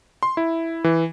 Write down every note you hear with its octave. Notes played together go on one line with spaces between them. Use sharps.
C6
E4
E3